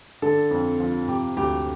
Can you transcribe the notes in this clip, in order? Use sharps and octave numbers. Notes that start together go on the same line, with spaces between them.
D3 A4
F2
F3
C3 G4
D2 G4